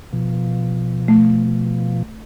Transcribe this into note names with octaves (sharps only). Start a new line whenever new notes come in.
B2 F3
A3